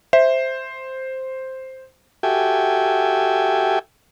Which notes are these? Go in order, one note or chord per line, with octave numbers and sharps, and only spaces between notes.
C5 E5
F#4 G4 A4 E5 G5 G#5